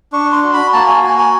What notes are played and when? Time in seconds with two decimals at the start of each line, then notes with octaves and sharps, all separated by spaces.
0.12 D4 C#6
0.32 C6
0.43 F#4
0.53 B5
0.73 A#3 A5
0.87 G#5
1.03 F#4 G#5
1.18 G#5